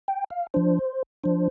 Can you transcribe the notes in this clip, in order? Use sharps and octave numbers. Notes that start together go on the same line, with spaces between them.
G5
F5
F3 D4 C5
F3 D4 C5